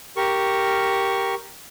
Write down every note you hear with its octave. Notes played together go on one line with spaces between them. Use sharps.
G4 A#4 C#6